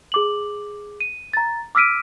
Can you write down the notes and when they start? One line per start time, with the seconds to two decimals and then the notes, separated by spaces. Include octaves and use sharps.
0.12 G#4 D6 F#7
1.01 D#7
1.33 A#5 A6
1.75 D6 E6 F6 B6 D7 D#7